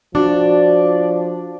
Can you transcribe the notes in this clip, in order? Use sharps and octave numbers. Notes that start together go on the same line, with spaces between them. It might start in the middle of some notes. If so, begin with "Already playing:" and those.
F3 D4 F#4 D5